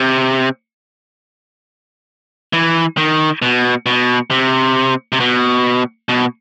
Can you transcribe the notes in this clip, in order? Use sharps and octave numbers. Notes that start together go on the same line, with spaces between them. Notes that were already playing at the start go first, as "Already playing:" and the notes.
Already playing: C3
E3
D#3
B2
B2
C3
C3
B2
B2